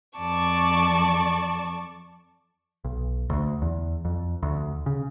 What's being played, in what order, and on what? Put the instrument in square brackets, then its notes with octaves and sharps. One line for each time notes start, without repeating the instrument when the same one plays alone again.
[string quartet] F2 D5 A5 C#6
[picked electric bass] B1
D2
E2
F2
D2
C#3